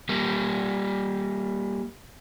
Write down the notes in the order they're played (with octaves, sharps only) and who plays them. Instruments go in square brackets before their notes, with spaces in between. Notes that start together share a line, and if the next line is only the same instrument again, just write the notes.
[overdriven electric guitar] G3 A#3